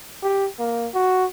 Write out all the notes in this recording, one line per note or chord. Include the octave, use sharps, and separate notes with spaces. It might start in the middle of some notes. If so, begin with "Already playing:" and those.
G4
A#3
F#4